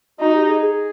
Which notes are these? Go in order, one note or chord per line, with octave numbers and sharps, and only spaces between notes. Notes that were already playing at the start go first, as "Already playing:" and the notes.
D#4 F#4
G4
G#4
G#4